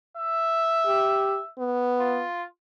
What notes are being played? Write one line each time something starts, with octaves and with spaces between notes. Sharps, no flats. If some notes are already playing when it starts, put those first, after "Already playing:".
E5
G4
B3
F4